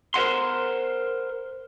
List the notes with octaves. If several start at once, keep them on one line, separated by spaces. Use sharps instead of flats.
A#4 C5 D#5 F#5 C6